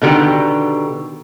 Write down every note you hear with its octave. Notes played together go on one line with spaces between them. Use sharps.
B2 D3 D#3 G4